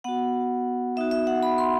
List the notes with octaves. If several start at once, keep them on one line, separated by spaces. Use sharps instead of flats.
B3 F#4 F#5
B3 D#4 F#4 E5
E5
F#5
B5
C6